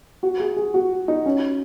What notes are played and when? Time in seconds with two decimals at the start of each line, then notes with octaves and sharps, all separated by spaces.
0.23 F#4
0.40 G#4
0.57 G#4
0.74 F#4
1.08 D#4
1.26 C#4